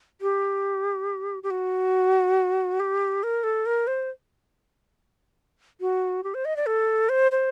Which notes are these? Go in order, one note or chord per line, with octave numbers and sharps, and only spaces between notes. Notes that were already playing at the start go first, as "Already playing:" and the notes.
G4
G4
F#4
G4
A#4
A4
A#4
C5
F#4
G4
C5
D#5
D5
A4
C5
C5